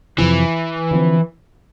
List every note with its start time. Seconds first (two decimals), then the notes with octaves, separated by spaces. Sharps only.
0.18 F2 C3 E3 F3 C4
0.91 D3 F3 A3 C4